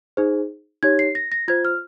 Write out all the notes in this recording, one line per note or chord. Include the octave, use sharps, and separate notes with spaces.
D#4 G#4 C5
D#4 G4 C#5 G#6
C7
A#6
A#6
F4 C5 G#6
F6